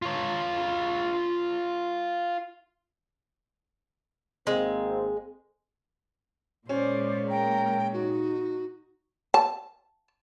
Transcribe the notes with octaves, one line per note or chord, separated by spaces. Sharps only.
F4 C#5
G#1 G#3 A#3 C4
A#2 G#3 C#4 C5 D5
A#4 G5
D#4 F#4
A5